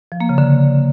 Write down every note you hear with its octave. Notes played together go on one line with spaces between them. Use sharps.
F3
A#3
C#3
D3